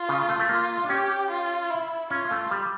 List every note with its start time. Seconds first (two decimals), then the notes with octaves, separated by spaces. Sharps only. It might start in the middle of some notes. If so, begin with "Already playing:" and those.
Already playing: F4
0.09 C#3
0.29 A3
0.40 A3
0.49 A#3 F4
0.84 D4
0.89 C#4 G4
1.30 F4
1.70 E4
2.10 C#4 F4
2.31 A3
2.51 G3